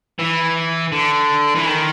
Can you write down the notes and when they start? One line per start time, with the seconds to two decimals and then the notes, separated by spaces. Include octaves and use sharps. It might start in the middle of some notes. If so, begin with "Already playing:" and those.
0.19 E3
0.92 D3
1.56 E3
1.66 D#3